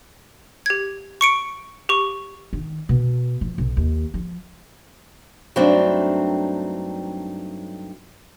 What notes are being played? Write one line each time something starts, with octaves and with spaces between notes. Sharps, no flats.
G4 G#6
C#6 C#7 D7
G4 C#6
D#3
B2
F3
B1
D#2
F3
G2 F#3 A3 C4 D4 D#4